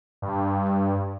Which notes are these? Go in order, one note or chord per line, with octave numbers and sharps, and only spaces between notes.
G2